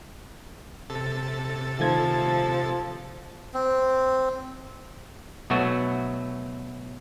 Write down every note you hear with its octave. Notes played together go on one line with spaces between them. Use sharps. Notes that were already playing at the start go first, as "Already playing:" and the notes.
C3 A4 A6
D#3 F3 A3 G#6
C4
B2 F#3 A3 F#4